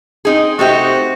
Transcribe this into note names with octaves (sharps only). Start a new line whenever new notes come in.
C4 D#4 G#4
C3 A3 D#4 F#4 G4